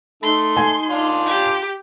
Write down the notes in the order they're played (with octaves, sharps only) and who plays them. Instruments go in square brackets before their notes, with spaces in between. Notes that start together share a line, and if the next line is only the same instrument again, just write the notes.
[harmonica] A3 [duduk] D#4 [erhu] C6
[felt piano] G#5
[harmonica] D4 F4
[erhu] G4